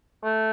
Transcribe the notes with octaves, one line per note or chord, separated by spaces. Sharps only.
A3